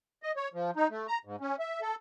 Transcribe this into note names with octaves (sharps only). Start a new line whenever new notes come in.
D#5
C#5
F3
D#4
A3
A#5
G#2
C#4
E5
A4